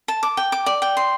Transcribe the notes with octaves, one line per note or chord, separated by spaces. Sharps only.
A5
D6
G5
D6
D5
G5
C6